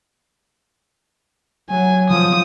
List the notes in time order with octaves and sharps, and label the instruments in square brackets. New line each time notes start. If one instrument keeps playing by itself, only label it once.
[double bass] F#3 [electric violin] G#5
[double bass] F3 [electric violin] D#6